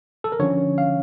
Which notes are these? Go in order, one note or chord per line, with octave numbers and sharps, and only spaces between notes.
A4
A#4
D3 F3 C#4 C#5
F5